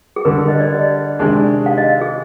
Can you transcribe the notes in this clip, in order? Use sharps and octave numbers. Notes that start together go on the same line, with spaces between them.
G#4
D3 G3 D4 A#4
D#5
D5
D#5
C3 D#3 G#3 D4
F5
D#5
G#4